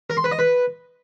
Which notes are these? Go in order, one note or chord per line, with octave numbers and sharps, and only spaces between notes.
A#4
C6
B4
D#5
B4